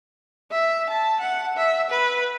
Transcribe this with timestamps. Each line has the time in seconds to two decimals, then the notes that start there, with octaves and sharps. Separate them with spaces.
0.51 E5
0.89 A5
1.20 F#5
1.57 E5
1.90 B4